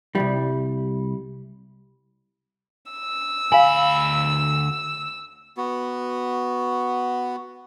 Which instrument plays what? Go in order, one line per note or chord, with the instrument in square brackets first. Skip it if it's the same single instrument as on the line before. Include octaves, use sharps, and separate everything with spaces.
[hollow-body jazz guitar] C2 F2 G3
[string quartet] E6
[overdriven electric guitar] D2 B5 [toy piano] F5 G#5
[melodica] B3 F#4